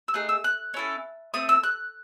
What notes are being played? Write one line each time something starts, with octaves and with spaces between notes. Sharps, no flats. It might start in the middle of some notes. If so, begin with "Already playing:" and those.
E6
A3 D#4 G#4 F#6
E6
F#6
C#4 E4 A4
A3 C4 D#6
E6
F#6